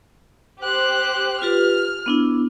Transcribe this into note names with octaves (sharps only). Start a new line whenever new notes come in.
G4 C5 F#6
F4 G4 B4 F6
B3 D4 E4